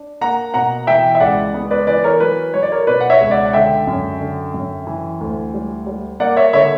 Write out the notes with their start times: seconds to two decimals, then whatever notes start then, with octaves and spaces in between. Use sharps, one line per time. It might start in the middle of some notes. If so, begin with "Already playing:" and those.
Already playing: D4
0.21 A#3 F#5 A#5
0.54 B2 F#5 A#5
0.87 E3 E5 G5
1.15 E5
1.20 C#2 D5 F#5
1.54 B3
1.71 B4 D5
1.87 E3 B4 D5
2.04 A#4 C#5
2.20 F#3 B4
2.54 F#3 C#5
2.63 D5
2.72 A#4 C#5
2.87 B2 B4 D5
3.01 F#5
3.10 C#5 E5
3.20 C#2
3.31 D5 F#5
3.46 F#5
3.53 D3 E5 G5
3.87 F#2
4.20 D3
4.54 F#2
4.87 E3
5.21 D2
5.54 G3
5.86 G3
6.20 A#3 D5 F#5
6.37 C#5 E5
6.53 D3 C#5 E5